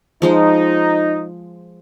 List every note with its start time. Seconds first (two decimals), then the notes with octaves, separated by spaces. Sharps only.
0.22 F3 G#3 D#4 C5